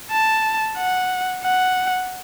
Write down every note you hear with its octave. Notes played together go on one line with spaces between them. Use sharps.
A5
F#5
F#5